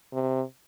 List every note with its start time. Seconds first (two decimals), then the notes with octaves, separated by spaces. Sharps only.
0.13 C3